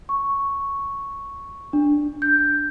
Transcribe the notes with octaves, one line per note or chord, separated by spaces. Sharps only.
C#6
D4
G6